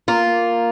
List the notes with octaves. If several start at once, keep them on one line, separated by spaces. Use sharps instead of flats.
A#3 F4